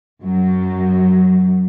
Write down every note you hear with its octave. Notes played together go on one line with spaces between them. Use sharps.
F#2 F#3